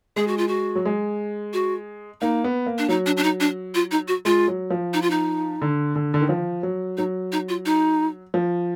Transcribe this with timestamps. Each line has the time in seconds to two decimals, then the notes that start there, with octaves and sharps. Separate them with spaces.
0.16 G#3 G#4
0.28 F#4
0.38 F4
0.48 F#4
0.76 F#3
0.85 G#3
1.53 F#4
2.21 A#3 D#4
2.44 B3
2.66 A#3
2.78 D4
2.89 F#3 D#4
3.06 D4
3.17 D4
3.23 D#4
3.40 D4
3.75 F4
3.91 D#4
4.08 F#4
4.25 G#3 F4
4.48 F#3
4.70 F3
4.93 D#4
5.02 F4
5.10 D#4
5.62 D3
5.96 D3
6.14 D3
6.21 D#3
6.29 F3
6.63 F#3
6.97 F#3 D#4
7.32 D#4
7.49 F4
7.66 D#4
8.34 F3